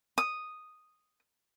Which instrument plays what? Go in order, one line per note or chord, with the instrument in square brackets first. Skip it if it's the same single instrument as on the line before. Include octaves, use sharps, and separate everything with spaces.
[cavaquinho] D#6